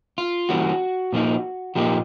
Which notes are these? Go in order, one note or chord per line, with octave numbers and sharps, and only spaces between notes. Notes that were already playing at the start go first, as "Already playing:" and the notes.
F4
E3 G3 A#3 C#4 F#4
A#2 F3 A#3 D#4
A#2 F3 A#3 D#4 G4